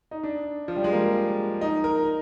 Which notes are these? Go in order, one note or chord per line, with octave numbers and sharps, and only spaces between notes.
D#4
D4
F3
G3
G#3
A#3
D#4
A#4